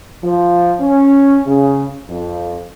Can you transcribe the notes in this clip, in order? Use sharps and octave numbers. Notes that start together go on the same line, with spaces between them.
F3
C#4
C#3
F2